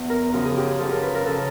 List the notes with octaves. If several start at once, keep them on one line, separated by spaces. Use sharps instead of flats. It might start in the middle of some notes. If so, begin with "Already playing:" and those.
Already playing: E2
A#4
F#2 C#3 F3 A#4
G#4
G4
G#4
F#2 C#3 F3 A4
A#4
B4
A#4
C#3 F3 A4